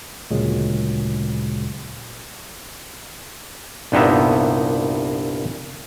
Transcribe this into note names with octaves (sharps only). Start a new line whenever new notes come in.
D2 A#2 C#3 F#3 G#3
C2 G2 A#2 B3 D#4 E5